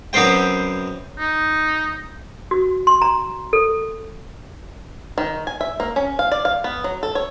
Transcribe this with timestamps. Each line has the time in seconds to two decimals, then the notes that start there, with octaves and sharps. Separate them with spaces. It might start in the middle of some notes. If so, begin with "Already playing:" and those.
0.13 F#2 B3 C4 C5 G5
1.19 D#4
2.51 F#4
2.87 C6
3.02 A#5
3.53 A4
5.18 D#3
5.47 G#5
5.61 E5
5.80 A#3
5.96 C#4
6.19 F5
6.32 D5
6.45 F5
6.64 B3
6.84 F#3
7.03 A4
7.15 C#5